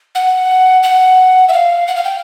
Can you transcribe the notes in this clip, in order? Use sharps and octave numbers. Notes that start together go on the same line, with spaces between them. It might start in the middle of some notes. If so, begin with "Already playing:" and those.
F#5
F#5
E5
F5
F#5
F5
G5